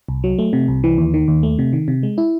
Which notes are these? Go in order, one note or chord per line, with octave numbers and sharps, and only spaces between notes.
C2
F#3
A3
C3
C2
E3
D#2
D#3
D#2
A3
C3
D#3
C3
G#3
E4